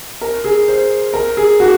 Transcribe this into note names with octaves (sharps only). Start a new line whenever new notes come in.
A#4
G#4
C5
A#4
G#4
F#4